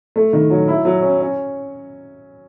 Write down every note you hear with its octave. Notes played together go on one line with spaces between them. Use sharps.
A3
D#3
F#3
E4
F#3
C#4
C#4